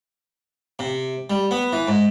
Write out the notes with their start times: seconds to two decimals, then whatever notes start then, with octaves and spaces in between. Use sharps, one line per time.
0.79 C3
1.30 G3
1.51 B3
1.73 E3
1.88 G#2